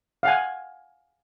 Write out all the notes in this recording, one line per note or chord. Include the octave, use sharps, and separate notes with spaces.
F5 F#5 G#5